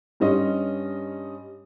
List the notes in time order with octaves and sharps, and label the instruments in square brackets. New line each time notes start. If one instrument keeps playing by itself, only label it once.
[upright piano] G2 G3 C#4 D#5 C6